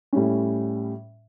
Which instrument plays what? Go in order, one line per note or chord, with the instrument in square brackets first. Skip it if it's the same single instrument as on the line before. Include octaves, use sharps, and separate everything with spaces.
[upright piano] A2 G3 C#4